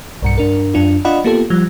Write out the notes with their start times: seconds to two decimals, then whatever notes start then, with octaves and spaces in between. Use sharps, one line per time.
0.22 B1 G2 C#7
0.38 G2 D4 A#4
0.74 F#2 D4 F4
1.05 D4 F4 D5 D#5 F#5 B5
1.24 A#3 B3 F4 G4 A4
1.50 F3 G3